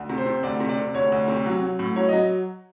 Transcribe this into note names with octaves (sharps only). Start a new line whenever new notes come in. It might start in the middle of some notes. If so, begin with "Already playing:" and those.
Already playing: D2
C3
C5
C3
D2 D5
C3
D5
C3
D2 C#5
D2
C3
F#3
F#3
A2
F#3 C#5
D#5
F#3